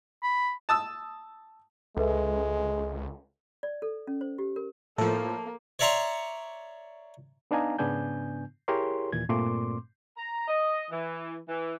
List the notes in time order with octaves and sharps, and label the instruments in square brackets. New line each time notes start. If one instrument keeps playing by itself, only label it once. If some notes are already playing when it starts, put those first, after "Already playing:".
[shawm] B5
[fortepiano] A5 D#6 E6
[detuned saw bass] C#2 [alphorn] G#3 [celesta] A4 B4 E5
[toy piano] D5
A4
C#4
C5
G4
A#4
[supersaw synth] A2 F3 [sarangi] A#3 [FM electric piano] A4
[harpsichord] C#5 D5 E5 A#5 C6 C#6
[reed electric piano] B3 D4 D#4 F5 G#5 A#5
G#2 C#3 B3 D4 G#5 G6
E4 G4 G#4 A#4 C#5 C6
D#2 A#2 E3 G#6
G2 A#2 A3 C4 C6 D6
[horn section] A#5
D#5
E3
E3